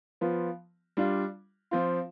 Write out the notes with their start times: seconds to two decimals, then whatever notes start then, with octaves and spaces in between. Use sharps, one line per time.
0.21 F3 B3 F4
0.97 G3 D4 F4
1.71 F3 C4 F4